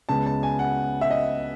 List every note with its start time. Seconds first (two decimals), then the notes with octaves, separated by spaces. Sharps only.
0.09 C#2 C#3 G#3 B3 A5
0.26 A5
0.43 G#5
0.59 F#5
1.01 E5
1.11 D#5